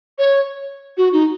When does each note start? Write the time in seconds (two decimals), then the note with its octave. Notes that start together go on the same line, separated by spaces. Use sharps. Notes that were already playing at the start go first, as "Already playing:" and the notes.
0.19 C#5
0.98 F#4
1.13 D#4